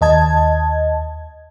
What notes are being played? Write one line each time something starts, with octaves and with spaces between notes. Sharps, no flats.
D#2 D#5 A5 G#6